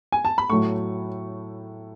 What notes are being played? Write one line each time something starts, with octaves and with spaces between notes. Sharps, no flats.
G#5
A5
B5
A2 F#3 A3 C#6